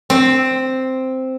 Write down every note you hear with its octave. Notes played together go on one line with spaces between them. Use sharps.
C4